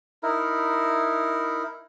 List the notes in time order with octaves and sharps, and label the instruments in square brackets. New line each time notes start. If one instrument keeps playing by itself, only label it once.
[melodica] D#4 E4 A#4